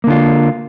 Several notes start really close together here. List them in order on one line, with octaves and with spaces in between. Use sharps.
A#3 D3 F4